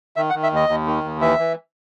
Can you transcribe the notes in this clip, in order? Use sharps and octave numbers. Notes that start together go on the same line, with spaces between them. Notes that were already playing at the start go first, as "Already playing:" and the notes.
D#3 E5
F#5
D#3
E5
D#2 D#5
D#2
D#3
D#2
E3 E5
E3